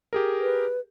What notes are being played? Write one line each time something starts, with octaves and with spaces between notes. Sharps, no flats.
G4 G#4 A#4
B4